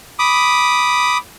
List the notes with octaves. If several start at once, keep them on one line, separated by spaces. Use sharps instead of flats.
B5 D6 D#6